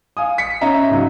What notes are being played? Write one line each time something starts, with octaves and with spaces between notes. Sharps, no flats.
F5 G#5 D#6
B6 C#7
C#4 D#5 E5 A#5
G#2 C#3 F#3